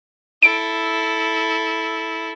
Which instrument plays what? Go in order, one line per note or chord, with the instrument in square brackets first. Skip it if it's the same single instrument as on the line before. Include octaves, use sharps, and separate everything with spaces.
[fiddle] E4 A4 [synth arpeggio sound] D7